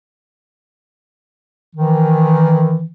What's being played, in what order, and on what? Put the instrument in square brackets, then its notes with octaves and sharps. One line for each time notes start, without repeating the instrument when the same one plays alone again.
[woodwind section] D#3 E3